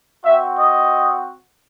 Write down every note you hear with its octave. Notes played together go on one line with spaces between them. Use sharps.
C4 F#4 E5
D#5